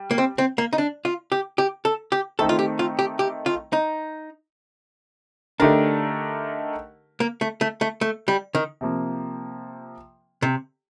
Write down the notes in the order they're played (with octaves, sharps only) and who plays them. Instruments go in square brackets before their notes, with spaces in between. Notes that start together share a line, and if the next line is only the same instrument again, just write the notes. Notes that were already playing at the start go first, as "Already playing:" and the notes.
Already playing: [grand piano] G3
[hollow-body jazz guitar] A#3
C4
C4
A#3
D#4
D4
F4
G4
G4
A4
G4
[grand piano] D#3 A3 C4 D#4 [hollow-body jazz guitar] A4
[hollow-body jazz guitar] F4
G4
F4
G4
G4
F4
D#4
[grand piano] D3 A3 D#4 G4 A#4 [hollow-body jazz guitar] D4
[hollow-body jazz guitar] A#3
A3
A3
A3
A3
G3
D#3
[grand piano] C3 F3 A#3
[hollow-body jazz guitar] C3